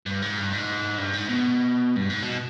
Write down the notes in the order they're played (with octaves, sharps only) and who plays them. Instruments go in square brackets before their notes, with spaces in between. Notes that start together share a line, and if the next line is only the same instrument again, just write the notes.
[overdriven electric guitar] G2
G#2
G2
G#2
G2
G#2
B2
G2
G#2
B2